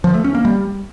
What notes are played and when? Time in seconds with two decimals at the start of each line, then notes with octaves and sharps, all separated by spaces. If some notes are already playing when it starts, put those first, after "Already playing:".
0.04 F3
0.14 A3
0.24 C#4
0.35 A#3
0.45 G3